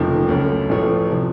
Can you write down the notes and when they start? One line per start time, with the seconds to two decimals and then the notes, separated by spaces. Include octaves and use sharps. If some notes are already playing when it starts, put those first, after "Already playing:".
Already playing: F1 D#2 C#3 F3 A3
0.29 C#2 C#3 F#3 A3
0.69 A1 A2 F3 A3 C#4
1.10 C3 F3